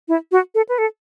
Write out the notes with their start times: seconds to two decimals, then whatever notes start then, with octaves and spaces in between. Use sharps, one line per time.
0.08 E4
0.32 F#4
0.55 A4
0.69 B4
0.78 A4